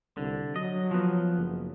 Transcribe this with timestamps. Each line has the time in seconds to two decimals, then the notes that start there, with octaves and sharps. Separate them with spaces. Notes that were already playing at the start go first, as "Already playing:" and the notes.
0.17 C2 D3
0.56 F#3 D#5
0.91 F3 B3
1.37 F#1